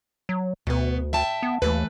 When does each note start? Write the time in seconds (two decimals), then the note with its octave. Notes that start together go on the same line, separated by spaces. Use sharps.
0.29 F#3
0.67 D2 B2 B3
1.13 E5 G5 A5
1.43 B3
1.62 D#2 E3 A3 B4